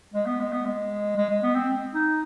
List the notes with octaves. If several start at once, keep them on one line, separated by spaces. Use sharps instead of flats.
G#3
B3
G#3
B3
G#3
G#3
G#3
B3
C4
D#4